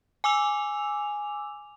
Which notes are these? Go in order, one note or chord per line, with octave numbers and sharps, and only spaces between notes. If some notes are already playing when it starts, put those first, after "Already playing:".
G#5 D6 E6 F7